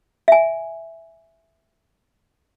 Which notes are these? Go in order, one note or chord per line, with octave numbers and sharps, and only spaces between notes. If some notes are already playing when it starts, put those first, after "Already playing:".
E5 G#5